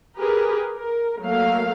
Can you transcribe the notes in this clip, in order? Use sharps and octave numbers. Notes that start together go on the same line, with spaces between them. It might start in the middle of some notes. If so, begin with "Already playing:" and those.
G4 G#4 A#4 B4
A#4
F#3 A3 A#3 F5